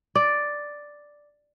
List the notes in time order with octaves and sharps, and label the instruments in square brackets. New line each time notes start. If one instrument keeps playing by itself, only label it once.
[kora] D5